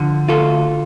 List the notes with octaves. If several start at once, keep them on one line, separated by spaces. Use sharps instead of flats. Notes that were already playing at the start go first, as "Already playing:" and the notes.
Already playing: D3 F3
D2 F4 A4